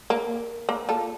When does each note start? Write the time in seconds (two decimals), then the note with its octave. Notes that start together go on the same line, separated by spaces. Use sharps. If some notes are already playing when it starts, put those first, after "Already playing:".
0.10 A#3
0.69 A#3
0.89 F4 A4